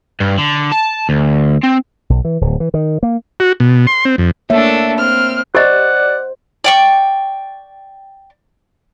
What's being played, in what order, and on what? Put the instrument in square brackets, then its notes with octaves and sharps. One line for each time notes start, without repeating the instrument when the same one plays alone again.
[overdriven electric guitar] G2
D3
A5
D2
C4
[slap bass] B1
E3
D1
E3
D#3
A#3
[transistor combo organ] F#4
B2
C6
C4
F2
[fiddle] A3 D4 [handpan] A#3 C#5 E5
[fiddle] C4 [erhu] F6
[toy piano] G4 D#5 [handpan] C5 [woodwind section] D5 [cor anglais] F#5
[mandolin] D5 G5 C#6